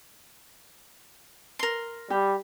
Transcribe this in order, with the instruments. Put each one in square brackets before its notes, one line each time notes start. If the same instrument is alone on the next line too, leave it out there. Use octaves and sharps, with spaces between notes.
[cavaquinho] A#4 C6
[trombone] G3 [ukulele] G4